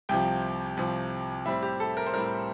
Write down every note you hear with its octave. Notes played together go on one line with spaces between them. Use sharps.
C2 C3 F3 G5
C2 C3 F3
A2 G3 C4 E5
G4
A4
A#4
C5
A2 G3 C4 A#4